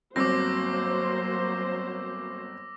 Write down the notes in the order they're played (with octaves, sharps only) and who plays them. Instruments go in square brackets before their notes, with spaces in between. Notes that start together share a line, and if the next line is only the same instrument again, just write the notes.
[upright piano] G1 C4 [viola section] F#3 A#3 C5 [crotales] D6 E6 A#6